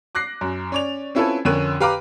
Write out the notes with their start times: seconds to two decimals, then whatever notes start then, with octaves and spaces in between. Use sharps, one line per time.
0.15 D6 F#6 A#6 C7
0.41 F#2
0.72 C#4 D5 F7
1.15 C4 C#4 E4 F4 A4 B4
1.45 F2 D3 C#4 A#4 F#6 D#7
1.80 G4 B4 F5 A#5 B5 D6